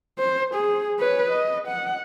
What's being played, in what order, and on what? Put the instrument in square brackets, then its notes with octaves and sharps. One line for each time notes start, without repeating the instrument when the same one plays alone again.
[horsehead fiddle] C5
G#4
B4 C#5
D#5
F#5